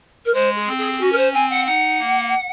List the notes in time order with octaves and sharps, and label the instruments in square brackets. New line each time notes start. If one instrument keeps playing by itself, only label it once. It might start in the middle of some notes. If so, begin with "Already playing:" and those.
[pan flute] A#4
[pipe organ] G#3 [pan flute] C5
[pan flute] G#4
[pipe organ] C4
[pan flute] G#4
G#4
[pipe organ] C#4 [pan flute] F#4
[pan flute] A#4
C5
[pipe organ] C4 [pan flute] G#5
[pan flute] F#5
[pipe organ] D#4 [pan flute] F#5
[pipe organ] A#3